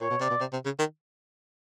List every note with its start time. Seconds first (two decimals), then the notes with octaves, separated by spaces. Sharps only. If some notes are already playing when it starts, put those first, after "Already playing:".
0.01 A#2 C#5
0.10 B2
0.20 C3 D5
0.30 B2
0.40 C3
0.53 C3
0.65 C#3
0.79 D#3